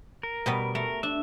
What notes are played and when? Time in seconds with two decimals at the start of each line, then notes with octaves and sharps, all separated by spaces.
0.23 A#4
0.46 B2 G3 B3
0.75 A3 A#4
1.03 D4 E5